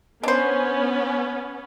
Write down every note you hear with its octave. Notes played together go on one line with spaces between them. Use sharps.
B3 C#4 D4 C5